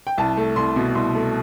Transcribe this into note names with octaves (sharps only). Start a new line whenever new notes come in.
G5
C2 A5
A3
C2 C6
B2
C2 C6
A3